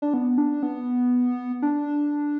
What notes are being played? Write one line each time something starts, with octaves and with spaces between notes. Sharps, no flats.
D4
B3
D4
B3
D4